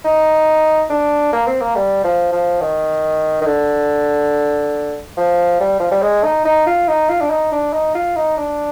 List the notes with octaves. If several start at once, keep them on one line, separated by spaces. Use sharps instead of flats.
D#4
D4
A#3
C4
A#3
G3
F3
F3
D#3
D#3
D3
F3
G3
F3
G3
G#3
D#4
D#4
F4
D#4
F4
D4
D#4
D4
D#4
F4
D#4
D4